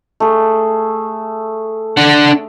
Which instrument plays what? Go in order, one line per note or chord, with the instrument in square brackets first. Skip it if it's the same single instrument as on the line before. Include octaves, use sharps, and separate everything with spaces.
[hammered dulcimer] A3 G#4
[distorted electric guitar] D4 F#5